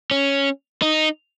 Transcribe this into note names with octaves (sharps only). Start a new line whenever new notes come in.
C#4
D#4